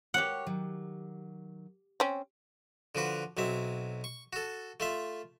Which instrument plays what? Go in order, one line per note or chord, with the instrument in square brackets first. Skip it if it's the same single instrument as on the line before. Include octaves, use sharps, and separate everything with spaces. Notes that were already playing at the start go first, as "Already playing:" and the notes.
[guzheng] G4 F#5 [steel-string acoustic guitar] A#4 C#5
[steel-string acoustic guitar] D#3 F#3
[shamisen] C4 C#4
[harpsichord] D3 F3 F#4 B4
B1 F#3 C4 E5
C#6
F#4 A4
A3 F4 E5